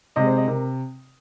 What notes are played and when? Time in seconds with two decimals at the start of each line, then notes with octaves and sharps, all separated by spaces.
0.16 C3 G#3 D#5
0.27 C5
0.37 D#5
0.47 C3 A#4